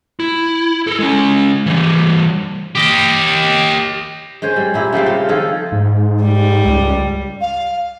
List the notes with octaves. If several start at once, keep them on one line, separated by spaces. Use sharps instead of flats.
E4
A4 A#4
G#3 C#4
E3 G3
G4 D#5
G#3 C#4 C5 C#5
G3
A#2 E4
C#3 G3 A3 C4
F4
D#3 F3 G#4 A4
G#2
G3
C#2
F5